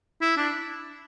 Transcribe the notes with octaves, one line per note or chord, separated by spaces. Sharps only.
E4
D4